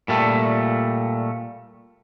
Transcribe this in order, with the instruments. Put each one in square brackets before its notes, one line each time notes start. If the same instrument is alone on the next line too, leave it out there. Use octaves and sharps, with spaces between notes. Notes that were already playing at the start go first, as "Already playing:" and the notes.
[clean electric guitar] A#2 G3 A3